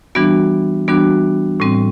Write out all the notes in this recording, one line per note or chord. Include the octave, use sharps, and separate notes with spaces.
E3 G3 B3 D4 F#4
E3 G3 B3 D4 F#4
A2 G3 C4